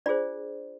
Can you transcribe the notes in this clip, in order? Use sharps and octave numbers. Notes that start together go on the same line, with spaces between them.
D4 F4 G#4 C5 D5